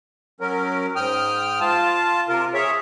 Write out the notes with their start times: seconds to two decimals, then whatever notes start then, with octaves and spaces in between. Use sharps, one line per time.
0.40 F#3 C#4 A#4
0.96 G#2 G5 D#6 F6
1.60 F4 A5
2.28 C3 F4 A#4
2.54 G#4 C#5 E5